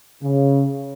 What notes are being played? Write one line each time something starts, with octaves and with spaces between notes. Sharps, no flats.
C#3